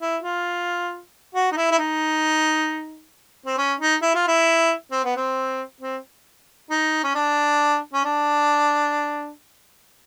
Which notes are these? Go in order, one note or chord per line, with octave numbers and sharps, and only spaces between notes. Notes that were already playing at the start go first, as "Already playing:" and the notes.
E4
F4
F#4
D#4
E4
E4
D#4
C4
C#4
D#4
E4
F4
E4
C4
B3
C4
C4
D#4
C#4
D4
C#4
D4